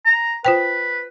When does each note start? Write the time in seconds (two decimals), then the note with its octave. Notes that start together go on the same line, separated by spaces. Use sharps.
0.05 A#5
0.45 F4 B4 C5 G5